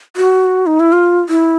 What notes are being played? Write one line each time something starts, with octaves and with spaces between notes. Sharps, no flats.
F#4
D#4
E4
F4
E4